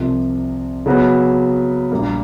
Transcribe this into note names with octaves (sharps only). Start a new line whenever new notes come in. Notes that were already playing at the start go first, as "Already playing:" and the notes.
Already playing: C2 C3 F3
C#3 F#3 B3
A#1 A#2 G3 A#3